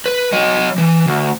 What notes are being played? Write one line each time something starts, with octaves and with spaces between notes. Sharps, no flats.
B4
F#3 D#5
E3
D2